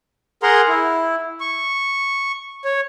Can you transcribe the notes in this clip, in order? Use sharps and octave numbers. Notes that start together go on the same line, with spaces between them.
G#4 A#4 F#5 A#5 C6
E4
C#6
C#5